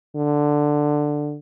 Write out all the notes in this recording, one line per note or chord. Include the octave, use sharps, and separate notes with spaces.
D3